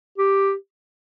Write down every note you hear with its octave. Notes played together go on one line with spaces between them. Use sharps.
G4